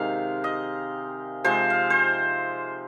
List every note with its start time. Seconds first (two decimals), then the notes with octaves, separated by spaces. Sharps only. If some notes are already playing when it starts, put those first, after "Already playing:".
Already playing: C3 D#3 G#3 F5
0.44 D#5
1.44 C3 F3 G#3 C5
1.70 F5
1.90 C5